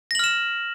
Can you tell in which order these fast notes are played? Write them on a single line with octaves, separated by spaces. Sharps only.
A#6 F#7 F6 E7